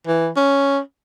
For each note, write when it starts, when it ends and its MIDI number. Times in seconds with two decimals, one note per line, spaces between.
0.07 0.29 52
0.36 0.80 61